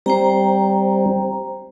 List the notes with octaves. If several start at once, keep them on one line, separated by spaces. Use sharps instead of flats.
G3 C4 C5 G5 A#5